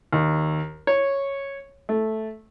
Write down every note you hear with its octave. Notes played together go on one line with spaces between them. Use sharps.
D#2
C#5
A3